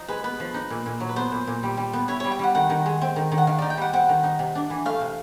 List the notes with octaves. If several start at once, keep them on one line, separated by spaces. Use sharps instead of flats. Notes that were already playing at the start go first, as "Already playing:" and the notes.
Already playing: F3 D#4
G#3 B4
B3 B4
F3
D#4
A#2
A#2
F#3
B4
B3 C5
A#2
A#2
G3
G3
B3
E4 C#5
G3 C#5
G5
G3 F#5
D#3 F#5
D#3
G#3
C4
D#3
D#3
F#5
D#3 F5
D#4 D5
G5
G3 F#5
C4 F#5
D#3
D#4
C3
D4
E3
A3 F5
C3